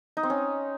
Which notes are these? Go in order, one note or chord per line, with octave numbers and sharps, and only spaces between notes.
D#4
C4
C#4